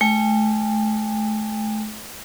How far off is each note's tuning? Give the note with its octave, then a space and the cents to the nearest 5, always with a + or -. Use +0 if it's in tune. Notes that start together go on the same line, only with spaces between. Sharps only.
A3 -35 G5 +40